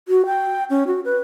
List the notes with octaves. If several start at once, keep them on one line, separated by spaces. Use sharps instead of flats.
F#4
G5
C#4
F#4
B4